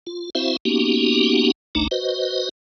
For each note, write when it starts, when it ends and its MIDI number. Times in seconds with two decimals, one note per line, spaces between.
0.07 0.30 65
0.35 0.57 60
0.35 0.57 64
0.35 0.57 66
0.35 0.57 72
0.35 0.57 76
0.35 0.57 77
0.65 1.51 58
0.65 1.51 59
0.65 1.51 61
0.65 1.51 63
0.65 1.51 66
0.65 1.51 67
1.75 1.87 32
1.75 1.87 38
1.75 1.87 57
1.75 1.87 62
1.75 1.87 63
1.75 1.87 82
1.91 2.49 66
1.91 2.49 71
1.91 2.49 72
1.91 2.49 75